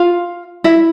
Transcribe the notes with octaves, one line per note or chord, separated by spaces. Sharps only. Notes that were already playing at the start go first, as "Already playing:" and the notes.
Already playing: F4 F5
E4 E5